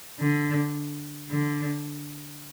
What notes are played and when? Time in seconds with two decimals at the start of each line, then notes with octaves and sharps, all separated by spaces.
0.20 D3
1.30 D3